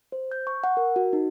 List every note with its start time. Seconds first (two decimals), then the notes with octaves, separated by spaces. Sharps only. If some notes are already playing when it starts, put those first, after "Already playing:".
0.12 C5
0.31 G6
0.47 C#6
0.64 F#5
0.77 A#4
0.96 F#4
1.13 D#4